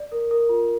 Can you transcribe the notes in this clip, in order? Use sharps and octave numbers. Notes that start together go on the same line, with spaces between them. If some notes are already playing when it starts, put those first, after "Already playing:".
Already playing: D5
A#4
A#4
F4